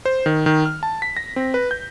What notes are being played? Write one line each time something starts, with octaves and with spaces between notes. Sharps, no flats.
C5
D#3
D#3
F6
A5
B6
A#6
C4
B4
G6